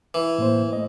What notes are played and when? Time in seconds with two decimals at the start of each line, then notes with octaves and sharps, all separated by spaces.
0.14 E3
0.38 A2 A#3 C5
0.73 A3 D#5